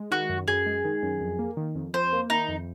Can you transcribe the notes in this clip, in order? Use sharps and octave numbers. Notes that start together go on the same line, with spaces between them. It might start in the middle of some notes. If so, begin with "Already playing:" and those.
Already playing: G#3
D#3 F#4
F#2
F#2 G#4
G#3
D#3
F#2
F2
A#3
D#3
F2
F2 C5
A#3
D#3 D#4
F2